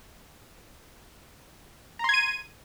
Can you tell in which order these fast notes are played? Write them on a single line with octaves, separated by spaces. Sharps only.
A#5 C6 G#6 D#7